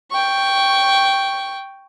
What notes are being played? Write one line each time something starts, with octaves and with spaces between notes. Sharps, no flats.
G5 C#6